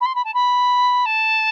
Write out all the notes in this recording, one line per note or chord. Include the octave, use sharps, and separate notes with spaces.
B5
C6
B5
A5
B5
A5